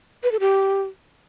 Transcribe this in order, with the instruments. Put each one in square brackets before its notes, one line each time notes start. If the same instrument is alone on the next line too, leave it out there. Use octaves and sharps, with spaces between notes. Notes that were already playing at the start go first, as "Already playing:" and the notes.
[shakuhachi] B4
A4
G4